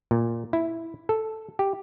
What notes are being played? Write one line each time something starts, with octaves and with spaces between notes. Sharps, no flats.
A#2
E4
A4
G4